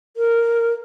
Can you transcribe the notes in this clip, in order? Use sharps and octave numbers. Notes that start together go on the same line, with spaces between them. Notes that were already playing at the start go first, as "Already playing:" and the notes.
A#4